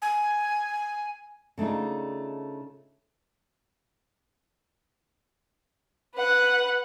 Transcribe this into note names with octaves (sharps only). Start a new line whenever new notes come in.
G#5
C#3 A3 D4 D#4 F4
B4 F#5